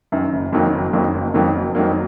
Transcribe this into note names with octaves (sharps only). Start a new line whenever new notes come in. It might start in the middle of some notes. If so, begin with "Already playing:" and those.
F#2 D#3
F#1
F2 D#3 F#3 A#3
F#1
F2 D#3 F#3 A#3
F#1
F2 D#3 F#3 A#3
F#1
F2 D#3 F#3 A#3